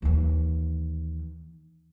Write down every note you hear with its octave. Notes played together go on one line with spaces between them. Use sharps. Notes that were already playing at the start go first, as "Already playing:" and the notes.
D#2 E3